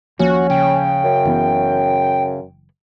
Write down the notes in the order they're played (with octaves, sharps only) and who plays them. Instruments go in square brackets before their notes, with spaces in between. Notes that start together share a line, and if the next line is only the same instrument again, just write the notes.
[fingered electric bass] D#2 F3 A#3 [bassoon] C#4 [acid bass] F#4
[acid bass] C#3 [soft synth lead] G5
[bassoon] F#2
[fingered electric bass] F#1 E3 B3